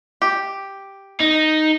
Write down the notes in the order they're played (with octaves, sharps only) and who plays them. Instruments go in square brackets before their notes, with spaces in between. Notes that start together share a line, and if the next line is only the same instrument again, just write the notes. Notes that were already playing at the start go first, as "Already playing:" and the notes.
[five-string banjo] G4
[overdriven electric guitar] D#4